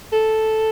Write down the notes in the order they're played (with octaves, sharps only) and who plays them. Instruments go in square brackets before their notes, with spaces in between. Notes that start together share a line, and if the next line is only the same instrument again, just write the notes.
[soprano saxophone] A4